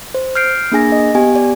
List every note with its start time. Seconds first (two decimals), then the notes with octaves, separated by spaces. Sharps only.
0.14 C5
0.35 F6 G6 C7 D7
0.72 A#3 D4 G#4 G#5 A#6
0.92 D#5
1.15 B3 G4 G#5
1.36 D5